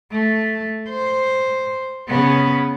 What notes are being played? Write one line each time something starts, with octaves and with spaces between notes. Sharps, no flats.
A3
C5
C#3 B3